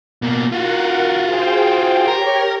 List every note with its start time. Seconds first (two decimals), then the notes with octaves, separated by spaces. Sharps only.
0.22 B2 A#3
0.52 F4 F#4 A#4 F#5
1.25 G#4 C5 G5
2.08 G4 A#4 C#5 G5